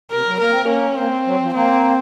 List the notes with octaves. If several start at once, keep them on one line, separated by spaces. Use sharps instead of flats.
C3 A#4
F#3
A#3 A#4
C4
A#3
C#4
A#3 C4
F#3
F3
A#3 C4